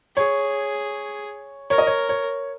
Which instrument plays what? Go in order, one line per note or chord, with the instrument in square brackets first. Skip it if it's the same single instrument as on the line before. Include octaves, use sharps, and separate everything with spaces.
[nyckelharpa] G#4 [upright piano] C#5
[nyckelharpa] A#4 [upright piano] C#5
[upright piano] D#5
C#5
C#5